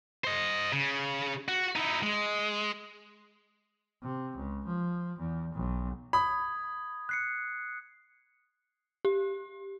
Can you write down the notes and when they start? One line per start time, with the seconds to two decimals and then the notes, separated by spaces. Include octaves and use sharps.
0.24 C5 D#5
0.73 C#3
1.48 F#4
1.76 D#4 E4
2.03 G#3
4.02 C3
4.37 C#2
4.67 F3
5.19 E2
5.55 B1
6.13 B5 D#6 G#6
7.09 F#6 C7 C#7
9.05 G4